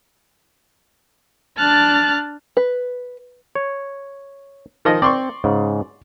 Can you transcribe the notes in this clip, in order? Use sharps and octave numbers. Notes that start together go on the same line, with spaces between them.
D4 A5 F6 F#6 A6
B4
C#5
D#3 F3 D#5
C4 D5 C6 C#6
G#2 C#3